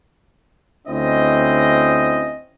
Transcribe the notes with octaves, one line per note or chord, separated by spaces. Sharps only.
D2 C4 C#4 E4 D#5